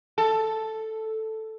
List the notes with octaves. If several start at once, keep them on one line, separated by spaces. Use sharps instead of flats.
A4 A5